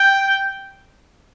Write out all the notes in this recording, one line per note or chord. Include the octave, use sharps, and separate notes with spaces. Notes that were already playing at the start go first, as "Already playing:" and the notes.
Already playing: G5